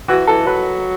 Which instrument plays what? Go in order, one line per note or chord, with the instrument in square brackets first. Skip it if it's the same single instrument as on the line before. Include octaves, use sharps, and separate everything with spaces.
[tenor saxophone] E3 [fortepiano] F#4
[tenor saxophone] E3 [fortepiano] A4
[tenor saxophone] F#3 [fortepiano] B4